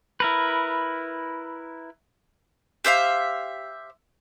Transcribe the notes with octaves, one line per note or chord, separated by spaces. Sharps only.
E4 A#4 B4
G4 C5 E5 F5